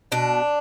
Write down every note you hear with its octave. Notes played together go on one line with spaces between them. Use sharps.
B2 D4